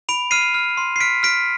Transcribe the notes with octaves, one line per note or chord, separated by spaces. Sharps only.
B5 D7 F7
F6 C7 D#7
F6
C6
C7
F6 B6 D7
F6 B6 D7